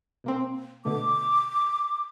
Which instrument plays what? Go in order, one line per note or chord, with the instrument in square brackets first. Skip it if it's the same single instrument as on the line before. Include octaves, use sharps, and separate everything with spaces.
[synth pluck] B2 A#3 C4
[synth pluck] B2 D3 A3 [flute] D6